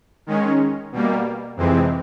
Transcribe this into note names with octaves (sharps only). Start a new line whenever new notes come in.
D#3 G#3 C#4
B2 G3 A#3
F2 C3 E3 G#3 C4